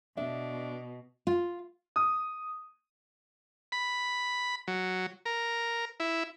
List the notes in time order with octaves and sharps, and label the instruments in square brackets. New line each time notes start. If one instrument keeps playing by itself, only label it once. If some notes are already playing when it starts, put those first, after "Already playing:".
[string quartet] B2 [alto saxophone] D4 [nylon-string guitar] E5
[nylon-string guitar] F4
[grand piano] D#6
[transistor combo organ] B5
F#3
A#4
E4